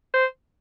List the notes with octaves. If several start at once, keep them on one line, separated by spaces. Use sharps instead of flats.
C5